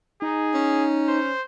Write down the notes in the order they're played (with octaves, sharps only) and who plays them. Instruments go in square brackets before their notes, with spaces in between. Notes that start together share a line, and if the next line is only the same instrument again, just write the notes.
[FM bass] D#4 [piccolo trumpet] G#4
[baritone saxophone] C#4
[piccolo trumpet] C5